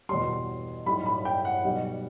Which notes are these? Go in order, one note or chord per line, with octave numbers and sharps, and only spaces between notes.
E2 B2 G3 C6
B1 A2 G3 B5
B5
G5
F#5
B1 B2 G3